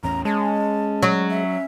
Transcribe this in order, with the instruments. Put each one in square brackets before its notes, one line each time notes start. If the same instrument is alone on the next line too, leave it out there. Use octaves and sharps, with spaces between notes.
[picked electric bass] A1 E2 C#4 [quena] A#5
[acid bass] G#3 [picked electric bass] C#4 [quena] A5
[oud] F#3
[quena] E5